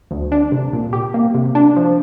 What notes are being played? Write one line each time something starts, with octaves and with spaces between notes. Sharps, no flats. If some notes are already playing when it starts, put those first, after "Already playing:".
D2
D4
C3
A#2
G4
A#3
C3
D4
F3